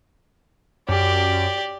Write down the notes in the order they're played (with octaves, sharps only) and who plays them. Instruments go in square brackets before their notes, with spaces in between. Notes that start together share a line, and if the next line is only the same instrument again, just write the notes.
[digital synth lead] F#2 [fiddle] G4 D5